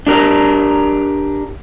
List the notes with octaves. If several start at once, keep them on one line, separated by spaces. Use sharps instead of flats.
D4 G4 A#4